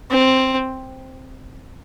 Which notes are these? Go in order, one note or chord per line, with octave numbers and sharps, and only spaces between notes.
C4